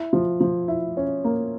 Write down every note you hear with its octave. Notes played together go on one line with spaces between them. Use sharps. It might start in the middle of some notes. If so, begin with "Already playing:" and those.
Already playing: E4
F3
F3
E4
C#4
A#3